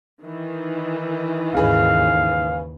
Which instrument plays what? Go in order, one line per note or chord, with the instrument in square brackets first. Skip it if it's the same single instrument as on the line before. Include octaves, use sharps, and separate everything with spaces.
[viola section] D#3 E3
[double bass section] D#2 G#2 [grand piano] C#3 G#4 B4 [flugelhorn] F5